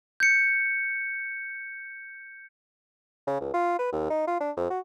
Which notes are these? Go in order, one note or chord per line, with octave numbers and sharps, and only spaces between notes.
G6 C#7
C#3
C#2
F4
B4
D#2
D#4
F4
D4
F2
F#4